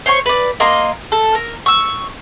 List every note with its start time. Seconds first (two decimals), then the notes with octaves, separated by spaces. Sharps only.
0.06 C5 C#5 G#5 C#6
0.26 B4 D5
0.60 A#3 D#5 A#5 C6
1.12 A4
1.35 A#4
1.66 C#6 E6